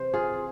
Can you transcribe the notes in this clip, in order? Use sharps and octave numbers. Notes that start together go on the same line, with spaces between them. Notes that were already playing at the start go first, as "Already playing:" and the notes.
Already playing: C3 E3 C5
F4 G#4